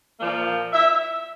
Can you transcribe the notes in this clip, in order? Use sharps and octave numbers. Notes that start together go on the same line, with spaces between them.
A#2 F3 A#3 D5
E5